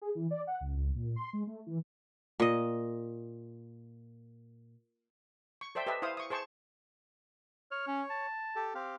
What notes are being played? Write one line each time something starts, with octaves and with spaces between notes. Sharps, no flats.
G#4
E3
D5
F#5
C#2
C#2
A#2
C6
G#3
A3
E3
A#2 D#5
C#6
A4 C5 D5 E5 G5
G4 A4 B4 D#5 E5
E4 C5 F5 D#6
C#6 D#6
G#4 C5 A5 C#6
C#5 F6
C#4
A5
G4 A4
C4 G4 F5